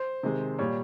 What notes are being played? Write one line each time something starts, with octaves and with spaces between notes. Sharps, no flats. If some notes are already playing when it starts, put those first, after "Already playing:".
Already playing: C5
C3 D#3 G#3
A#2 G3 C#5